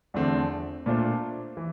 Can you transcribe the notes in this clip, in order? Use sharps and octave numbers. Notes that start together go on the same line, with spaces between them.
E2 D3 F3 A3 C4
A#2 A3 D4 F4 C5
E3